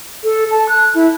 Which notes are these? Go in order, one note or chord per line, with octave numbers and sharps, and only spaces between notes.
A4
A5
F#6
E4